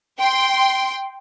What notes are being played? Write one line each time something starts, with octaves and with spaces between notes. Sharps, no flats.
G5 C6